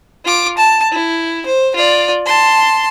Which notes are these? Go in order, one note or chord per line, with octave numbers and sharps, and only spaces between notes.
F4 D6
A5
E4
C5
F4 D5
A5 C6